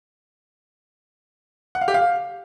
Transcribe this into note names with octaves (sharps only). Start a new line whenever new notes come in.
F#5
F5
G4
F5